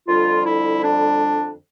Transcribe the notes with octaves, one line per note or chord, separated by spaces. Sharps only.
F2 D3 G3 F4
E4
D4